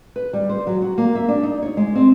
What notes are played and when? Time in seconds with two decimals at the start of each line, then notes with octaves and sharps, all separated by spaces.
0.16 B4
0.33 G3
0.49 C5
0.67 F#3
0.82 F#4
0.98 A#3
1.15 E5
1.28 D4
1.43 D#4
1.63 C#5
1.77 G#3
1.95 C4